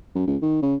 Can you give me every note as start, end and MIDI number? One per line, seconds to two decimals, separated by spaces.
0.15 0.26 42
0.27 0.36 37
0.42 0.61 51
0.62 0.75 49